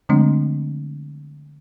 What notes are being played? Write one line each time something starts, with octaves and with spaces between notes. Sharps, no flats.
D3 F3 G#3 A3 C4 D4